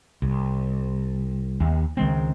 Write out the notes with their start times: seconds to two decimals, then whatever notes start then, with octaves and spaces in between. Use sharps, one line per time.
0.22 C2
1.60 D#2
1.97 C#2 D#3 G#3 C4